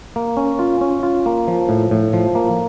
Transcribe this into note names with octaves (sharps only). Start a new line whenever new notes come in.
A#3
C#4
F4
C#4
F4
A#3
F3
A2
A2
F3
A#3